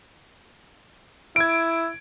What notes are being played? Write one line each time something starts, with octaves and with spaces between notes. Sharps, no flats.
E4 G#6 D7